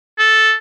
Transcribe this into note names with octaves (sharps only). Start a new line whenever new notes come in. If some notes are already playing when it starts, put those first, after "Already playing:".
A4